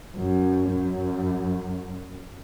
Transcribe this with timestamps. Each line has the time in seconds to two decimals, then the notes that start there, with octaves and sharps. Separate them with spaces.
0.17 F#2
0.70 F#2